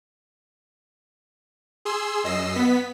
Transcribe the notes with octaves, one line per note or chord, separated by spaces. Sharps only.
G#4 C6 E6
F#2 D#5 E6 C7 E7
B3 B6